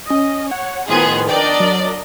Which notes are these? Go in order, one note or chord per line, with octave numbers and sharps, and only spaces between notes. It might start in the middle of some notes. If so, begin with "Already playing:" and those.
C#4 D#5
C#5 F#5
A2 D#3 F3 B3 G#4 C6
D4 A#4 D5 D#5 G5
F#3